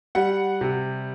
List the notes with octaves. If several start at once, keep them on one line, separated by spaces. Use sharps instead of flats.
G3 F#5
C3